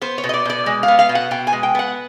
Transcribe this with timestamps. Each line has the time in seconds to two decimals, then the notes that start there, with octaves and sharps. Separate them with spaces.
0.01 B3 C5
0.18 C#5
0.24 B2
0.29 D#5
0.34 D5
0.45 B2 D5
0.66 G#3
0.83 F5
0.88 B3
0.99 F5
1.09 B2
1.15 F#5
1.31 B2 G5
1.47 G#5
1.53 G#3
1.63 G5
1.75 B3 F#5